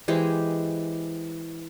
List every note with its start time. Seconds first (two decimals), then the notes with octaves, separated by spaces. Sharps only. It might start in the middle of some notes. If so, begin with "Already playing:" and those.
0.08 E3 G#3 G4 C5